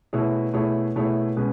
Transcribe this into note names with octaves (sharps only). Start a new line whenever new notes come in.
B2 A3 E4 G#4 C#5
B2 A3 E4 G#4 C#5
B2 A3 E4 G#4 C#5
B2 G#3 C#4 G#4 B4